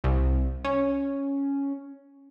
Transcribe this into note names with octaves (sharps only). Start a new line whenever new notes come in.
C2
C#4